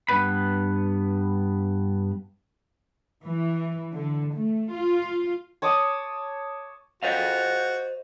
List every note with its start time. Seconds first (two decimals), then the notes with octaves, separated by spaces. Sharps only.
0.09 G2 B2 B3 B4 B5
3.25 E3
3.93 D3
4.34 A3
4.72 F4
5.62 C#5 A5 D6 D#6
7.03 F#4 C5 D#5 F5